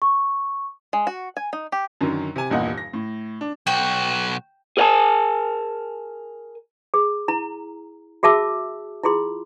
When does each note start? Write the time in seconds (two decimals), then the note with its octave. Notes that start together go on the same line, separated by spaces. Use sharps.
0.02 C#6
0.93 G#3
1.07 F#4
1.37 G#5
1.53 D#4
1.72 G4
2.01 F#2 D3 D#3 F#3
2.36 C3 G#5
2.50 D#1 E2 G2 A#2 D#5 F#5
2.78 A#6
2.93 A2
3.41 D4
3.67 B1 F#4 G5
4.77 G#4 A#4 C5 F5 G#5 A5
6.94 G#4
7.28 E4 A#5
8.23 F#4 G#4 E5 A5 D6 E6
9.04 E4 F4 G#4 C6